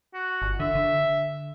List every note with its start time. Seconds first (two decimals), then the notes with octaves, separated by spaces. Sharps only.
0.14 F#4
0.42 G1
0.60 D3 E5
0.75 D3